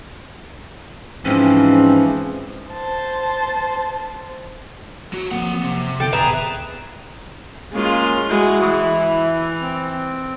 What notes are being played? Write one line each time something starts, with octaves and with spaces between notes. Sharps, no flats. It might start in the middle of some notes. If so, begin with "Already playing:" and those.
G#2 E3 F3 C4 C#4
C5 A5
F#3 F#4
F3 F#3 A#3 C4 F#5
C3
D3 D#3 B3 A4 G5
D1 E2 G#4 B4 E5 A#5
G#3 A#3 C#4 F4
G#3 E4 F#4
E3
C4